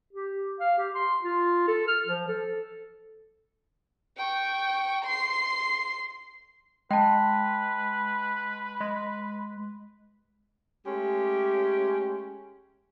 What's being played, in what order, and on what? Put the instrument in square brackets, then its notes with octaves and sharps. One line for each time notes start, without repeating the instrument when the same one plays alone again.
[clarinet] G4
F5
G4
C6
F4
A4
F6
F3
A4
[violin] G5 C#6
C6 C7
[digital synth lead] G#3 [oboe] B4 [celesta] G5 A5
[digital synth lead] G#3
[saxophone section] G#3 A3 C#4 G4